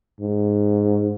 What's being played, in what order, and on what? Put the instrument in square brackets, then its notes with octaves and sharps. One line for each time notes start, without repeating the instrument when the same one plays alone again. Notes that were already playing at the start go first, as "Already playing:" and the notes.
[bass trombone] G#2